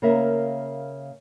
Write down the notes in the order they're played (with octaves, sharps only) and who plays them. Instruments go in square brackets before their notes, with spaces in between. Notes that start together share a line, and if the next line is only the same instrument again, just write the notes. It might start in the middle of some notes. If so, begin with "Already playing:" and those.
[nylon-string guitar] C#3 A#3 A#4 E5